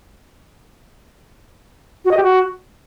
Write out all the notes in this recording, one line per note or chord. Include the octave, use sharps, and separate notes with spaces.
F#4
D#5
G4
F#4